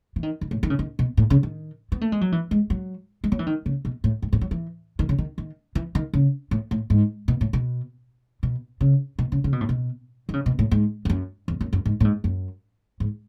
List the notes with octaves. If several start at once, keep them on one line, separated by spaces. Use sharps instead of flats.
E3
D#3
D#3
A2
D#3
C#3
D#3
B2
A2
C#3
D#3
B3
A3
G#3
F#3
E3
G#3
F#3
G#3
F#3
E3
D#3
C#3
B2
A2
G#2
A2
F#3
E3
D#3
C#3
D#3
D#3
E3
D#3
C#3
A2
A2
G#2
B2
A2
B2
B2
C#3
B2
C#3
C#3
B2
A2
B2
D#3
C#3
B2
A2
G#2
E2
F#2
E2
F#2
F#2
G#2
A2
G#2
F#2
G#2